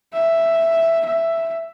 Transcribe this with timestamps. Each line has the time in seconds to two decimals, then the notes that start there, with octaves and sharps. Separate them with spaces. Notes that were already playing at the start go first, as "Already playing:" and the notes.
0.13 E5
1.05 E5